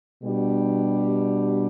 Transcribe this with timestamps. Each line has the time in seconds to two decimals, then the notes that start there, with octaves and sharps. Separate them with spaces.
0.22 B2 G3 D4 G4